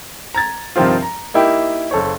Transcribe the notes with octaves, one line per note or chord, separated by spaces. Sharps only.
A#5 G#6 A6
G2 C3 D#3 F3 C4 F4
A#5
A#3 D#4 E4 G4 G5
F#1 A4 C5 C#5